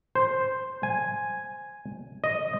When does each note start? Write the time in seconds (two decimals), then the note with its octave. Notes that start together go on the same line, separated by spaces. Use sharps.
0.15 C5
0.83 G#5
2.24 D#5